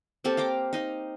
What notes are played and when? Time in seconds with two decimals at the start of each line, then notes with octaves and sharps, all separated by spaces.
0.24 A#3 C4 G4 A4
0.37 F5 G5 A#5 D6
0.73 D#4 D#5 F5